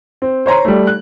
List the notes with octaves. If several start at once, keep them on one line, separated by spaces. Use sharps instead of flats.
C4
C5 C#5 A#5 C6
G3 A3
F#6